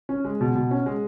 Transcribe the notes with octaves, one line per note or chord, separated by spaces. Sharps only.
C#4
G#3
B2
B2
C#4
G#3